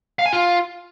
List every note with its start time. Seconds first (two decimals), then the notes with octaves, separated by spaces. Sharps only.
0.19 F5
0.26 G#5
0.33 F4